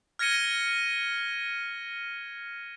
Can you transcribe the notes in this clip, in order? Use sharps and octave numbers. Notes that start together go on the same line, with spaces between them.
F6 G#6 A#6 C#7 D#7 G7